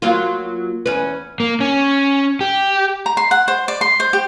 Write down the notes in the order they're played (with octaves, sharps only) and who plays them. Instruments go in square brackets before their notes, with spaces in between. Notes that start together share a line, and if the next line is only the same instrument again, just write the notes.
[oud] F#3 A#3 F4
E2 C#4 B4
[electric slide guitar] A#3
C#4
G4
[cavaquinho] A#5
C6
F#5
C5
D5
C6
C5
G4